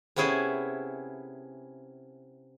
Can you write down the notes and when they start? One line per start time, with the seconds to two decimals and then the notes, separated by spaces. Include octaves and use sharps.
0.16 C3 B3 C#4 E4 G#4 A4